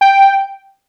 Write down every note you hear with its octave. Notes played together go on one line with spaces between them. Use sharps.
G5